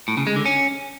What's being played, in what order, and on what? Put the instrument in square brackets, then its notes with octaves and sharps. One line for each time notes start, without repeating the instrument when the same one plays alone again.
[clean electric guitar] A2
C#3
G#3
D3
C#4